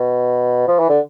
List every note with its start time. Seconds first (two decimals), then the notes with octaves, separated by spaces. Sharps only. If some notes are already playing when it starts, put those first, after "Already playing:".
Already playing: B2
0.68 F3
0.79 E3
0.89 D3